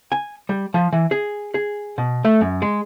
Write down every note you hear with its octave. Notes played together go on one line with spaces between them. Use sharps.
G#5
G3
F3
E3
G#4
G#4
B2
A3
F#2
G#3